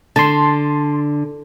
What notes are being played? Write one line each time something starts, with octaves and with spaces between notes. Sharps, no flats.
D3 A5 C6